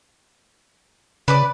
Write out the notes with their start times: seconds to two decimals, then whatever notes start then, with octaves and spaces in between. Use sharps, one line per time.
1.28 C#3 B4 D5 D6